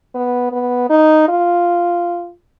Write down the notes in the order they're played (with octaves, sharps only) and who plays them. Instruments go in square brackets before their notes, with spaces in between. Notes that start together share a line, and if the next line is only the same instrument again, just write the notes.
[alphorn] B3
B3
D#4
F4